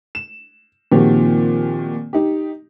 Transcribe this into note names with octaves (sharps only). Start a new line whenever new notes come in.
E7
A#2 D#3 F3 C4 F#4 G4
D#4 G4